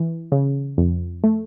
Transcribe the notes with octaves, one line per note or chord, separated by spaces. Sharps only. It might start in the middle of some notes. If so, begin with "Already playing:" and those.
Already playing: E3
C#3
F2
A3